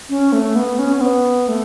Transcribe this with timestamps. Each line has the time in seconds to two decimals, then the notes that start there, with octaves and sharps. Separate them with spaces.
0.09 C#4
0.33 A3
0.56 B3
0.79 C#4
0.97 C#4
1.01 B3
1.48 A3